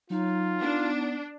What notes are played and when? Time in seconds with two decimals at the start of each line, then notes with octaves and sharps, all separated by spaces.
0.10 F#3 D#4 F4
0.62 B3 D4